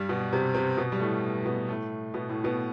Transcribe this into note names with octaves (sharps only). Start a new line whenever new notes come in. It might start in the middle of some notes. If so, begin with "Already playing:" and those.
Already playing: G2 G3
B2 B3
C3 C4
C3 C4
B2 B3
G3
A2 A3
B2 B3
A2 A3
B2 B3
A2 A3
B2 B3